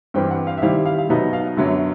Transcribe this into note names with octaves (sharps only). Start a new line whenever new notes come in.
G2 E3 G3 C4 G5
F#5
F5
E5
D#3 G3 C4 E4 F5
F5
F5
B2 F#3 B3 D#4 E5
F5
F#2 D3 F#3 B3 E5